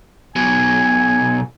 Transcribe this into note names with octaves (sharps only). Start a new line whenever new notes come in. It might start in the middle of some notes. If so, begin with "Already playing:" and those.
B1 B2 G#5